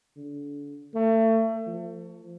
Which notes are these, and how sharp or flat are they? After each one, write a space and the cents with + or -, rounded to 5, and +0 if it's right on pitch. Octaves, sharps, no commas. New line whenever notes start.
D3 -35
A3 +30
F3 -10